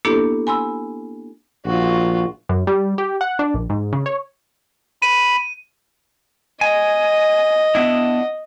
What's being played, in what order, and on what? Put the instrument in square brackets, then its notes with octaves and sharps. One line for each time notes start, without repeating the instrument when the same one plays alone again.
[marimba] A#3 B3 D4 E4 G4 A4
G#5 B5 C6 E6
[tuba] A#1 [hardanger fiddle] F4 F#4
[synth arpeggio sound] F#2
G3
G4
F#5
D4
A#1
G#2
C#3
C#5
[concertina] B5 [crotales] D#7
[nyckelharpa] D#5 [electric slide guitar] G#5
[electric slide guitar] B3 D4 E4